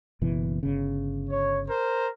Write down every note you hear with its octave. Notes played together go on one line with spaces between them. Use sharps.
F#1 B2 E3
G1 C#3
C#5
A#4 C5